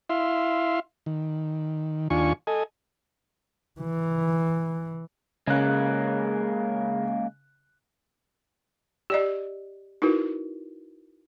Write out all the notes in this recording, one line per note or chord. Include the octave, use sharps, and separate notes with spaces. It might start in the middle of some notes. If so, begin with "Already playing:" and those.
E4 E5 F5 C6
D#3
D#2 D4 F4 G#5 C#6
A4 D#5 G#5
E3
C#3 G#3 A#3 C#4 F#6
G4 D5 D#5
D#4 E4 F#4 A#4 B4